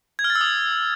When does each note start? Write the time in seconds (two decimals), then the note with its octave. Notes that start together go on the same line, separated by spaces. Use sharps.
0.19 G#6
0.24 F6
0.30 A6
0.35 E6
0.41 D#6